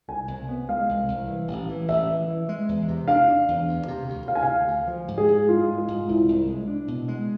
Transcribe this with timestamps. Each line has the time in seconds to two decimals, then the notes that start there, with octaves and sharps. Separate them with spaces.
0.08 C2 G#5
0.28 C2
0.49 B3
0.69 G#3 F5
0.89 C2
1.08 C2
1.28 E3
1.48 A1
1.69 E3
1.88 A1 E5
2.08 E3
2.28 E3
2.49 G#3
2.69 E2
2.88 C3
3.08 D4 F5
3.28 D4
3.48 E2
3.68 D2
3.88 C3
4.08 D2
4.27 C3 F5
4.35 G#5
4.43 D2 F5
4.68 D2
4.87 F3
5.08 G#2
5.18 G#4
5.28 G#2
5.48 G#3 F4
5.69 G#3
5.78 F4
5.88 G#2
6.09 C2 E4
6.28 C2
6.49 G#3
6.68 D4
6.88 B2
7.08 G#3